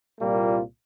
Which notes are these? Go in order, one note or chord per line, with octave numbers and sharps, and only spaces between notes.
C2 A#2 G3 A#3 F4